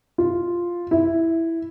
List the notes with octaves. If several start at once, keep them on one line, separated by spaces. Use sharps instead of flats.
F4
E4